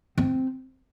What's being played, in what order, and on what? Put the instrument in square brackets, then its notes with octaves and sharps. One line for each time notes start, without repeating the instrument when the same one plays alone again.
[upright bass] C4